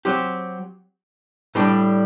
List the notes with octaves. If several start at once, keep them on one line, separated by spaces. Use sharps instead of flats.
F#3 C4 G4
A2 G3 D4